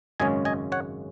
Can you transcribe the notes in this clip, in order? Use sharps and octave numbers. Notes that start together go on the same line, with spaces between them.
G#1 F#2 C#3 G#3 C#4 D#5 G#5
D#5 G#5
C#5 F#5